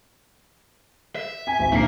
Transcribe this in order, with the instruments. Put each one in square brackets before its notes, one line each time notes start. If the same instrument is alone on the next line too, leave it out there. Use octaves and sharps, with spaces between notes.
[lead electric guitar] E5
[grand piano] G#5
G#1
[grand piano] A#1 D#3 C7 [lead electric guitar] A#3